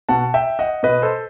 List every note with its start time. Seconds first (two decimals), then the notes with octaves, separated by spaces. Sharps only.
0.09 B2 F#5 A5
0.34 E5 G5
0.59 D#5 F#5
0.83 B2 B4 D#5
1.02 A4 C5